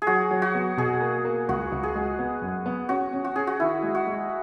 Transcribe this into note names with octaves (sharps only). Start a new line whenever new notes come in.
G#4
F#3 F#4
F#3
F#4
B3
B2 G#4
A#3
A#3
C#2 F#4
C#2
G#4
G#3
B3
F#2
B3
C#4 F#4
C#4
F#4
C#4 G#4
F#4
D#3 E4
G#3
F#4
G#3